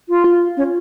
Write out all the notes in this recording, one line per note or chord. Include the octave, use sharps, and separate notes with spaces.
F4
F4
C#4